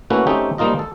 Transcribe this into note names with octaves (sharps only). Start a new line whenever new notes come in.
A3 A#3 C#4 E4 F#4 B4
A3 C4 C#4 D#4 G4 A4
F3 G3 A#3 D#4 F4 D#5
A4